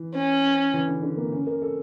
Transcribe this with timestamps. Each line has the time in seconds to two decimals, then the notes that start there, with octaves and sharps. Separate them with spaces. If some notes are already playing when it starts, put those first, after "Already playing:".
Already playing: E3
0.15 C#4
0.73 E3
0.88 D3
1.03 D3
1.17 A#3
1.32 C#4
1.47 A#4
1.62 A4